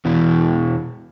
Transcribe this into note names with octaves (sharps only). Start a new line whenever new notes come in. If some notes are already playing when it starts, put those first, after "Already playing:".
E2 B2 E3